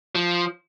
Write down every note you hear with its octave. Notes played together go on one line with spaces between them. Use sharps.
F3